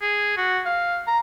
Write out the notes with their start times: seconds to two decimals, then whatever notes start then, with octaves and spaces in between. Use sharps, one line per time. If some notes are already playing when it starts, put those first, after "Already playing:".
0.01 G#4
0.37 F#4
0.65 F5
1.07 A#5